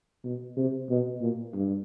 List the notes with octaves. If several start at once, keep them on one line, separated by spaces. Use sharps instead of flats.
B2
C3
B2
A#2
G2